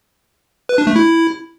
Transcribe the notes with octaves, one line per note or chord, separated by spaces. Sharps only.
B4
D4
A3
E4